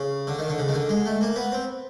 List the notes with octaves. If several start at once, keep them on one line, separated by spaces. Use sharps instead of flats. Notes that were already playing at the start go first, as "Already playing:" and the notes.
Already playing: C#3
D3
D#3
D3
C#3
D#3
D3
G#3
A3
A#3
B3
C4